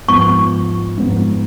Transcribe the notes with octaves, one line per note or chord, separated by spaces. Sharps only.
G#2 F3 B3 C#6
G#2 F3 B3